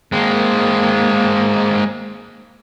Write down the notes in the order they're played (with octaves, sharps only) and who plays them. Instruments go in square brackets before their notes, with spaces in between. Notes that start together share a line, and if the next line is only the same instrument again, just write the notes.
[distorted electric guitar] G#3 C4 [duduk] A#3